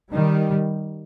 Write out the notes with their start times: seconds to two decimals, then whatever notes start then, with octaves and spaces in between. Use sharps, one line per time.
0.13 D#3 G3